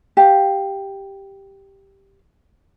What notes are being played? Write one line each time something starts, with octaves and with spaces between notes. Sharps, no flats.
G4 F5